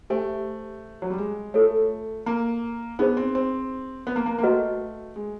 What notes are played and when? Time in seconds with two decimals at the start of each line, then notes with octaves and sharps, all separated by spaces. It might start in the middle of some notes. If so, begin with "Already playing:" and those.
0.10 A3 G4 C5 E5 G#5
1.02 F#3
1.10 G3
1.18 G#3
1.54 A3 F4 A4 C#5
2.26 A#3
2.99 B3 D#4 G#4 C5
3.17 C4
3.35 C4
4.07 B3
4.16 A#3
4.26 A#3
4.38 A#3
4.43 A3 F#4 B4 D#5 F#5
5.16 G#3